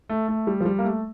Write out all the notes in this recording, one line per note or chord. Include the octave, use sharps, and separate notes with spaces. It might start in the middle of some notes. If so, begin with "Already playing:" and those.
A3
A3
G3
F3
G3
A#3
A3